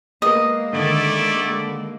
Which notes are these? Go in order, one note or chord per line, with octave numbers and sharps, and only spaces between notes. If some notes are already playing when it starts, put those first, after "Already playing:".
G#3 A#3 B3 A#4 B4 D#5
D3 D#3 A3 E4 D5